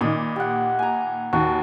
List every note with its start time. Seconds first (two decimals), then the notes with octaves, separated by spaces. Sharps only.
0.01 A#2 D#3 D5 D#5 B5
0.36 G4 F#5
0.79 G#5 A#5
1.33 D#2 F#4